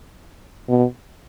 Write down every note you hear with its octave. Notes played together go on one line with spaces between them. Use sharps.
B2